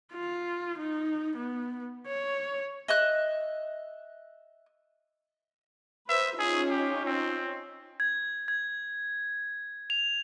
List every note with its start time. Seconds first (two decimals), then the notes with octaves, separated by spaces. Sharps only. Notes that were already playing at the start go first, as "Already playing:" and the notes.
0.13 F4
0.78 D#4
1.36 B3
2.07 C#5
2.88 D#5 E5 F#6
6.09 B4 C5 E5
6.39 C#4 D#4 F4 G#4
6.70 G4
7.05 C4
8.00 G#6
8.48 G#6
9.90 F7